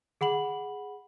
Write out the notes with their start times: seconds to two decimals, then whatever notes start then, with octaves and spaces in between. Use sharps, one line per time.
0.21 G#4 F#5 B5 F#7